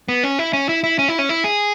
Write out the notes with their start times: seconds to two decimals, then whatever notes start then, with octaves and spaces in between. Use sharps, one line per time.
0.09 B3
0.23 C#4
0.39 E4
0.53 C#4
0.69 E4
0.84 E4
0.99 C#4
1.08 E4
1.19 C#4
1.29 E4
1.44 G#4